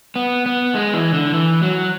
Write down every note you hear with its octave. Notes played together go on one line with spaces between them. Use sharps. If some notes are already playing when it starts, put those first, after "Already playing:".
B3
B3
G#3
E3
D3
E3
F#3